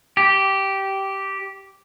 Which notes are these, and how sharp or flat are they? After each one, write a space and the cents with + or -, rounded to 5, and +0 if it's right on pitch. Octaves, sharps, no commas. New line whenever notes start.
G4 -10